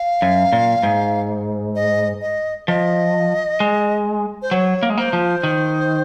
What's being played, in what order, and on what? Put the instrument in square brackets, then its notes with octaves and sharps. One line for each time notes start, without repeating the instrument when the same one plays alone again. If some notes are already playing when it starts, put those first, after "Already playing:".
Already playing: [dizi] F5
[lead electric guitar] F#2
A#2
G#2
[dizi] D#5
D#5
[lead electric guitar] F3 [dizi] D#5
[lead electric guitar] G#3
[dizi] C5
[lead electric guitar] F#3 [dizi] C#5
[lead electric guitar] A#3
G#3
[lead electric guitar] A#3 [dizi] C5
[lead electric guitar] F3
D#3